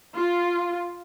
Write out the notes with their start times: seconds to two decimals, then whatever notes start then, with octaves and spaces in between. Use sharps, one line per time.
0.17 F4